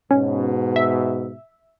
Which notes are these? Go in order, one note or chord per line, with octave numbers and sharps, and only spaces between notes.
G#2 B2 C#4
E5